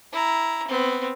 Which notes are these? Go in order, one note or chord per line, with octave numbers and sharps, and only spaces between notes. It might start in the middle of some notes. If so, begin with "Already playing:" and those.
E4 A#5
B3 C4